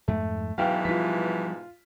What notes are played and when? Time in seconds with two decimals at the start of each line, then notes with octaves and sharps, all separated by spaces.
0.08 F2 G#2 A3
0.58 G#2 B2 E3 F#3 F5 G5 F6
0.85 F3 G3 F4 B6